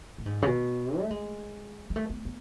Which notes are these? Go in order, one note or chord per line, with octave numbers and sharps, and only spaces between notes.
A2
G#2
C#3
B2
A3
G#3
G#3
A3
B3
B3